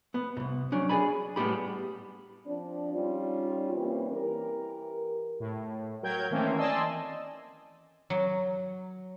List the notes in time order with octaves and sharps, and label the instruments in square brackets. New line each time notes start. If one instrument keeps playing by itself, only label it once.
[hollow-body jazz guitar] B3
C2 G#2
F#3 C#4 D4
G#4 A4 D5 G#5 B5
A2 G3 B3 G4 B5
[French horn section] F3 C4 D4
G3 C#4 D#4 F4
E3 G3 A#3 C4 C#4
E3 G4 A#4
[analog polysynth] A2
F#3 A#4 G5 G6 G#6
D#3 E3 A3 A#3 C4 C#4
D5 D#5 G#5 A5 C6 E6
[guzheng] F#3